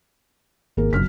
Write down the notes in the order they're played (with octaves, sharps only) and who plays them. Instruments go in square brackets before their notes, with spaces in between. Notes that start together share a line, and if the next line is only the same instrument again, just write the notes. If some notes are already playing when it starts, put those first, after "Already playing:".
[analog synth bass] G#1 [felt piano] A#3 G#4 A#4
[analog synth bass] F#1 [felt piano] B1 F6 B6